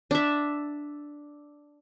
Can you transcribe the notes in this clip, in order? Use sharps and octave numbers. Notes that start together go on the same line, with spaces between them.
D4 E5